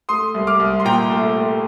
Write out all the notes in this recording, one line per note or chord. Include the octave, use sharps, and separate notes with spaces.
A3 C6 D#6
C2
D6 F6
C2
C6
A#2 G5 A#5
A3
A3